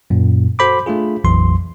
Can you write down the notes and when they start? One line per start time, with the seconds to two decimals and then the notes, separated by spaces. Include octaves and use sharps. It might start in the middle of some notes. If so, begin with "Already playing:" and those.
0.10 F#2 A#2
0.59 F#4 A4 C5 B5 C6 D6
0.86 A3 D4 F4 G#4
1.24 A#1 F2 E3 F#3 C6